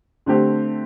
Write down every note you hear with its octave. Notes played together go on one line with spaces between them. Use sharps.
D3 A3 C4 G4